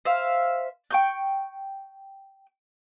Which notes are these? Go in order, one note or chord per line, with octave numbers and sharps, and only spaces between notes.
C5 E5 F5
G5 C#6 G6